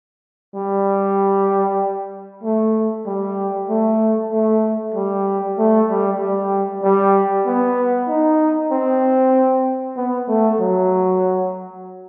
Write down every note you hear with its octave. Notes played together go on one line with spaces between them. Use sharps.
G3
A3
G3
A3
A3
G3
A3
G3
G3
G3
B3
D#4
C4
B3
A3
F#3